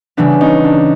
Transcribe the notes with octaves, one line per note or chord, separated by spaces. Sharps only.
C#3 E3 G3 B3 D4
C#4 D#4
D4